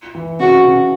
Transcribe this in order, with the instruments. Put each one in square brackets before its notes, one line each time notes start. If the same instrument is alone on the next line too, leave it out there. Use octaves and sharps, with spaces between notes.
[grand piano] E3
[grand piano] C#3 [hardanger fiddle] F#4
[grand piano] C#3